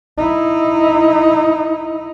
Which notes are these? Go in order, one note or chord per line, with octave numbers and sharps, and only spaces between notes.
D#4 E4